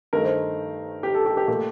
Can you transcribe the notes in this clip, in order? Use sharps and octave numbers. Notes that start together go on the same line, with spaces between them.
G2 D#3 A3 A#4
C5
G4
A4
G4
G4
A#2 A3 G4